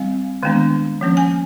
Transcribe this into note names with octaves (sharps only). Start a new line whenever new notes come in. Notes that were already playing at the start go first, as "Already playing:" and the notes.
Already playing: G3 C4 F5
D#3 G#3 B3 D4
F3 A#3 C#4
G#5